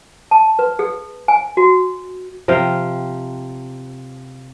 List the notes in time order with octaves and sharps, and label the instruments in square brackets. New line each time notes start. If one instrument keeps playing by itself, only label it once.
[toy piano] A5
B4
G#4
G#5
F#4
[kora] C3 F3 F5 G5